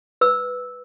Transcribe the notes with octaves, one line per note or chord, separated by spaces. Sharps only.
B4 E6